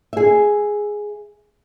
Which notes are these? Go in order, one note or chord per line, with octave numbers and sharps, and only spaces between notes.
G#4 E5